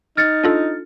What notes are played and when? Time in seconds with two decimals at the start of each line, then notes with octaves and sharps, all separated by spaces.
0.17 D#4 F6 A6 C#7
0.44 D4 F4 A4